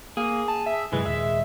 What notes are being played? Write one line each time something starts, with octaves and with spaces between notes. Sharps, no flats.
A#3 G#4
A5
E5
G2 C3 E3 F#3 G#3
D#2 A#2 D#3 E5